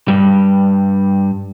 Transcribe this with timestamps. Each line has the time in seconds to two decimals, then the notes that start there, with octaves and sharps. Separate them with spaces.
0.08 G2 G3